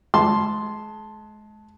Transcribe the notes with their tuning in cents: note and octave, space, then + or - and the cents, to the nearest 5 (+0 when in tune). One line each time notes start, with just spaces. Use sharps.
G#3 +30 A5 +0 C6 +0